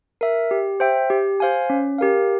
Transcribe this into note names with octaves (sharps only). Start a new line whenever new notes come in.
A#4 E5
G4
C5 E5 G5
G4
C5 F5 G#5
C#4
G4 A#4 F5